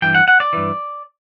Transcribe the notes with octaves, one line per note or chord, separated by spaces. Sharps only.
G2 E3 G5
F#5
F#5
D5
G2 E3